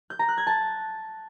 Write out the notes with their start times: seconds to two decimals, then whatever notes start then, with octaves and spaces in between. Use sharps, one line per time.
0.10 G6
0.19 A#5
0.28 F#6
0.38 G#6
0.47 A5